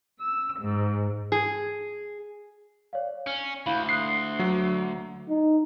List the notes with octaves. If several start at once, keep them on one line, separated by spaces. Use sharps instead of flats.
E6
G#2
G#4
C#5 D5 F5
C#4 F6
D2 E4 F5 B5
C6 D#6 F#6 C7
F#3
D#4